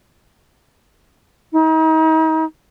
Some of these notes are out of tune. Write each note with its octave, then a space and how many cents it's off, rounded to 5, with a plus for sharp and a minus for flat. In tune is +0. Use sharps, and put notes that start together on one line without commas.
D#4 +40